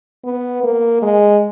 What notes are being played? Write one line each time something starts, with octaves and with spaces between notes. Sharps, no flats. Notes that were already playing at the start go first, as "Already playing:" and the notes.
B3
A#3
G#3